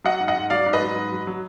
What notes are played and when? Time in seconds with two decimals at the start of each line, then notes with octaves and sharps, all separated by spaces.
0.04 F#3 D#5 F#5
0.20 G#2
0.28 D#5 F#5
0.36 G#2
0.50 F#3 D5 F5
0.66 G#2
0.73 B4 D#5
0.81 F#3
0.96 G#2
1.12 F#3
1.27 F#3